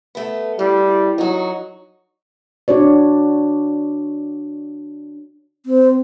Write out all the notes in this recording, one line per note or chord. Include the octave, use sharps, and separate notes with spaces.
A3 B3
A2 G3
F#3 D#4 F#4
D4 F#4 C#5 D5
C4